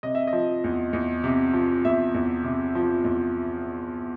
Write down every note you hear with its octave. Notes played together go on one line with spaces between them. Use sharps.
C3 D#5
E5
D#5
F3
E2
E2
C3
F3
E2 E5
E2
C3
F3
E2